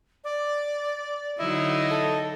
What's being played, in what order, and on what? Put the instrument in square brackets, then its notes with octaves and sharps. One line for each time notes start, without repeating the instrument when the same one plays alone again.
[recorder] D5
[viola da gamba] D3 F#3 D#4 [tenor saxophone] E4 [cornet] D#5
[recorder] A4